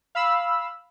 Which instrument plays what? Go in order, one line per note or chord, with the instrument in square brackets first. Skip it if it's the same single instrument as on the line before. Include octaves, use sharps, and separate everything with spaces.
[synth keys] F5 B5 E6